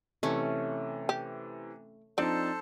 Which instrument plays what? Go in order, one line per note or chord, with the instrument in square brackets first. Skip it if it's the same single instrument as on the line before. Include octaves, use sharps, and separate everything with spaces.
[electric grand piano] C3 E3 [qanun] A3 C#4
[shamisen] G4
[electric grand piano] F3 C4 D#4 [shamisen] D4 D5 [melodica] A4 C5 A5